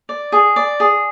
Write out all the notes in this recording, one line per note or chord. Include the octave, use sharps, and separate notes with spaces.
D5
G#4
D5
G#4